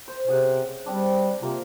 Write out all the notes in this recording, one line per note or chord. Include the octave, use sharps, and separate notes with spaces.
C5
C3 C#4 G#4 F#5
G3 C4 D4
C3 A#3 F4